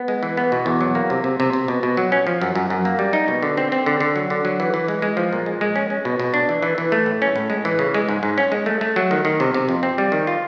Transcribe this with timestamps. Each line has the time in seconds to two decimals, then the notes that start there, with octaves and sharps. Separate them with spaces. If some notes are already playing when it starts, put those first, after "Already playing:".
Already playing: B3
0.08 G#3
0.23 E3
0.37 B3
0.52 B2
0.66 E2
0.81 F#3
0.95 A#3
1.10 C3
1.24 C3
1.40 C3
1.53 C3
1.68 B2
1.83 B2
1.97 F#3
2.12 C#4
2.27 F3
2.42 F#2
2.55 F#2
2.70 F#2
2.85 A#3
2.99 G3
3.13 D#4
3.28 B2
3.43 D3
3.57 C4
3.72 C4
3.86 D3
4.00 D3
4.16 F#3
4.30 D3
4.45 F#3
4.60 E3
4.74 E3
4.88 G#3
5.02 G#3
5.17 F3
5.33 A#2
5.46 G#3
5.61 G#3
5.76 C#4
5.90 C#4
6.05 B2
6.20 B2
6.34 D4
6.49 E3
6.63 E3
6.78 E3
6.92 A3
7.06 A2
7.22 C#4
7.36 A2
7.50 G#3
7.65 E3
7.79 C#3
7.95 G#3
8.09 G#2
8.23 G#2
8.38 C#4
8.52 G#3
8.66 A3
8.81 A3
8.96 F#3
9.11 D#3
9.25 D#3
9.40 C3
9.54 C3
9.69 F2
9.83 C4
9.98 G3
10.12 D#3
10.27 F4